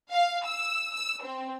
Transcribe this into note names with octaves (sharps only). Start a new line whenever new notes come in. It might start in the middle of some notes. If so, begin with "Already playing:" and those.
F5
E6
E6
C4